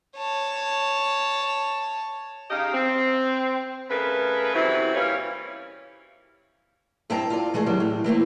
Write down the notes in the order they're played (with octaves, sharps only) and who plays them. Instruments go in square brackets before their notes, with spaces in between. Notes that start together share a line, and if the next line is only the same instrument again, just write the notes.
[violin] C#5 A5
[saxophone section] C#3 D#4 G4 D#5 F5
C4
C#3 A3 A#4 B4
F#2 C3 E3 F#3 E4
A#2 E3 G3 C#4 F4 C#5
[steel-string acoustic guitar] G2 C4 E4 G5 A5 A#5
F4 D5
E3 G#3 A3 G#4
D#3 E3 F#3 G3 C4
A2
E3 A3 A#3 C4